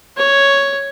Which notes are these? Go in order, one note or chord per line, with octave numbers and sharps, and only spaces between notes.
C#5